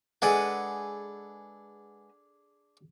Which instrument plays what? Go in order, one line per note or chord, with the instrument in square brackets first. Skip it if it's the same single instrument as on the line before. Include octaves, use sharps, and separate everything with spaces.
[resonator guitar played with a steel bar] G#3 B4 F#5 [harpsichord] D4 G#4 A4